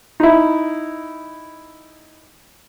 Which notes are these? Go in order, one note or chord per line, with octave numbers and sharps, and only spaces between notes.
D#4 E4